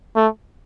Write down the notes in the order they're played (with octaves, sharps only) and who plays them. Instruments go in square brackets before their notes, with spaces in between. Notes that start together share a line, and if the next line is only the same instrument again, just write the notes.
[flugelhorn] A3